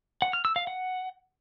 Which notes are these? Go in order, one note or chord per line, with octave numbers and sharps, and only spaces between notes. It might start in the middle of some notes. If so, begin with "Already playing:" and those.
F#5
F6
E6
F5
F#5